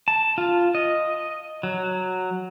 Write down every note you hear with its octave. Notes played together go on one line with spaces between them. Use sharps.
A5
F4
D#5
F#3